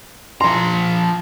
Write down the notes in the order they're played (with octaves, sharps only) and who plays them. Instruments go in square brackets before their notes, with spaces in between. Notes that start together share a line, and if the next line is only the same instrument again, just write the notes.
[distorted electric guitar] F3 A#5 [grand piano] C6